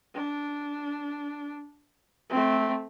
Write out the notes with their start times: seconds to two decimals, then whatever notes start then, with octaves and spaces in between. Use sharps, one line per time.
0.15 D4
2.30 A3 C4